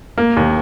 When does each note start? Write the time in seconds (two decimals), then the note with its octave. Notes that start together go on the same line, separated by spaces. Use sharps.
0.18 A#3
0.37 D#2